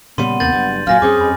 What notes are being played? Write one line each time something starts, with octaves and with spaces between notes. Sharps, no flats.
A#2 C#3 G3 B3 C6 D#7
D#2 C3 A#3 G6 A6 F#7
F#1 G2
F#2 A#2 F#3 F5 G#5 F6 A#6
F#2 C4 C#4 G#4 D6
F2 G#5 B5